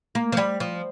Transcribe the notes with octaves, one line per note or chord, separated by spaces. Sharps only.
A#3
F3
G3
F3